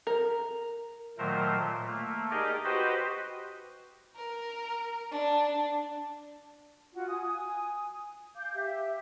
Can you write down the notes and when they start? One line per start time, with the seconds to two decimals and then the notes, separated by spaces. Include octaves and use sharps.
0.07 A#4
1.18 A#2 D#3 F#3 A3 A#4 C5
1.56 A#2
1.86 A3 A#3
2.31 D#4 G4 G#4 A#4 D5 D#5
2.64 F#4 G4 B4 C5 D#5 G5
4.16 A#4
5.11 D4
6.93 F4 F#4
7.08 G#5 D#6
8.36 F5 D6 G6
8.56 G4 E5